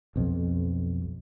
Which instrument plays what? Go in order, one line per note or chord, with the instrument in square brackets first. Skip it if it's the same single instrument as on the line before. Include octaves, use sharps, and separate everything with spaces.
[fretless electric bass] B1 F2